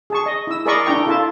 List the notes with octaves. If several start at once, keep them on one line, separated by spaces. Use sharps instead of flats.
G#4 A5 C#6
D#5
E4 E6
G#4 A#4 D5 D#5 B5 C#6
D4 E4 G5 A#5 C#6
E4 F4 A4 E5 A5